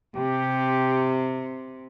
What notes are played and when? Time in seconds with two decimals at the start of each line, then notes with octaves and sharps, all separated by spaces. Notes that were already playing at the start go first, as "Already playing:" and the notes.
0.16 C3 G4